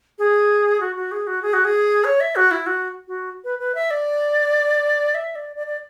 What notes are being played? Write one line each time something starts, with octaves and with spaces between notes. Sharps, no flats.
G#4
F#4
F#4
G#4
F#4
G#4
F#4
G#4
C#5
E5
F#4
E4
F#4
F#4
B4
B4
E5
D5
E5
D5
D5
D5